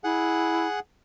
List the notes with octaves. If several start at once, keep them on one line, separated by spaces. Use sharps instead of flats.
E4 G#4 F#5